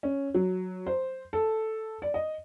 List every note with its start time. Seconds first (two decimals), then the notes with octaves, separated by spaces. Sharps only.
0.03 C#4
0.34 F#3
0.86 C5
1.33 A4
2.02 D5
2.14 D#5